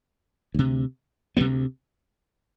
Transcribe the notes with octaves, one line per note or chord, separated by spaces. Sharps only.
D2 C3
D2 C3 G3 B3